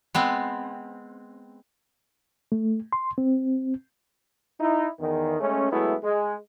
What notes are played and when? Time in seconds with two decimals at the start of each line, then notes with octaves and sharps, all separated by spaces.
0.15 G#3 B3 C4
2.52 A3
2.93 C6
3.18 C4
4.60 D#4 E4
4.99 E2 D#3
5.40 G#3 A3 C#4
5.71 F#3 G#3 A3 B3 E4
6.04 G#3